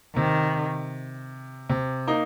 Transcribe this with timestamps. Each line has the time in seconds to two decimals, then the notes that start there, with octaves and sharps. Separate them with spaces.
0.16 C3 D#3
1.69 C3
2.07 A#3 D#4